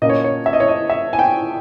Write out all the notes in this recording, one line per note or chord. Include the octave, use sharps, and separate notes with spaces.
A#2 A#3 C#4 D#5
C#5
C#5
E5
D#5
C#5
D#5
E5
G#5
G5